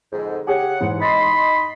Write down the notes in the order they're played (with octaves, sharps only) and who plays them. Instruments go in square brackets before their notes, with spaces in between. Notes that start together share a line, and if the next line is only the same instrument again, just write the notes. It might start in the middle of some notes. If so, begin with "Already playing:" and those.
[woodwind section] F2 G#2 D3
[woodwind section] C#3 F#5 [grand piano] G4 G#4 C#5
[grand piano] G#2 E3
[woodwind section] D#4 D#5 C6 [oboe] B5 [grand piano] A6 A#6 C7